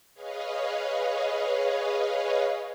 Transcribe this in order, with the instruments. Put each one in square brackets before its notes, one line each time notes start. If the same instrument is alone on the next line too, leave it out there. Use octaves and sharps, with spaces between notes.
[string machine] G#4 B4 C#5 D#5 F5